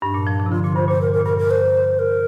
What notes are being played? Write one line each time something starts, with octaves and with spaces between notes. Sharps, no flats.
G2 D4
A#2
F3
F3
C3
D3 F4
A#2 F4
G2 C5
A#2 C5
A#2 A#4
A#4
A#2
G2 A#4
A#4
C5
A#4